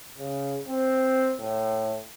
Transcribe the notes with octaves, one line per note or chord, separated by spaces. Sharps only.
C#3
C4
A2